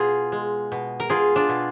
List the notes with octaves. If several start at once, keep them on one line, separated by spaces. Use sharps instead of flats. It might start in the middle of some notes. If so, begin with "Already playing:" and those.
Already playing: B2 F4 G#4
G#3
B2
A#4
B2 F4 G#4
D4 F4
B2